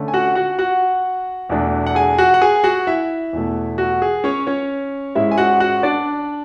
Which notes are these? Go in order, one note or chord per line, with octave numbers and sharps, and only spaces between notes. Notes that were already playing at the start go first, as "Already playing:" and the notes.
Already playing: D3 A3 C#4
G#5
F#4 F#5
F#4 F#5
F#4 F#5
E2 B2 A3 D4
F#5
G#4 G#5
F#4 F#5
F#5
G#4 G#5
F#4 F#5
E4 E5
E2 B2 A3
F#4
G#4
C#4 C#5
C#4 C#5
G#2 G#3 C#4 E4 E5
G#5
F#4 F#5
F#4 F#5
D4 D5